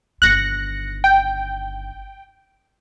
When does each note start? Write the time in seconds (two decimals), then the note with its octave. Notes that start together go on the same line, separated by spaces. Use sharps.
0.22 G1 D#3 F#6 A#6 C#7
1.04 G5